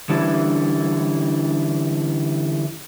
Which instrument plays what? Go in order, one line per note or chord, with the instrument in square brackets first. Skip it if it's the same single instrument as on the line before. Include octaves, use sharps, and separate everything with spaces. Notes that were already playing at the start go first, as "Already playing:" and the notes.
[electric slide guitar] D3 E3 G3 C#4 D4 E4